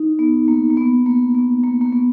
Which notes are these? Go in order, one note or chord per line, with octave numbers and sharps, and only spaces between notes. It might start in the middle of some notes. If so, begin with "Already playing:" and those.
Already playing: D#4
B3
A#3
A#3
B3
A#3
B3
A#3
A#3
B3